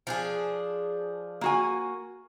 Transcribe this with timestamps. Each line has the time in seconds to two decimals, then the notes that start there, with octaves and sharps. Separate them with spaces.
0.07 F3 D4 G#4
1.41 A#3 F#4 G#5